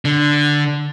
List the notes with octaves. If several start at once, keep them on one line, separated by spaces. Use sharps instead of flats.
D3